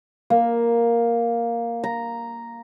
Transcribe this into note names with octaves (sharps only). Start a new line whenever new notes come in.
A#3
A#5